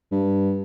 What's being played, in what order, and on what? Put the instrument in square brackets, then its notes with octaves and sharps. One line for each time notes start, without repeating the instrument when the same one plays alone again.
[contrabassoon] G2